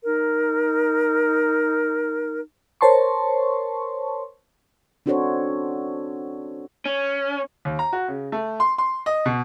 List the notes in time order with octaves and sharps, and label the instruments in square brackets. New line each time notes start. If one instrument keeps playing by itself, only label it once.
[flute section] D#4 A#4
[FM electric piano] A#4 C5 C#5 A5 C6 C#6
[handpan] C4 D4 F#4 A4 C5 C#5
[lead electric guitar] C#4
[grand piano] D#2
A#5
F#4
C#3
A3
C6
C6
D#5
B2